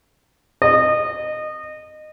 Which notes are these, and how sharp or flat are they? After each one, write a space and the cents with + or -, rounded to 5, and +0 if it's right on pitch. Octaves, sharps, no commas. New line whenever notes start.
D#5 -20